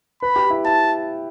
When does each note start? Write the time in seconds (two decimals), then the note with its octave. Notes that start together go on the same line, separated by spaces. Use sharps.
0.22 B4 B5
0.36 G4
0.50 E4
0.65 E4 A5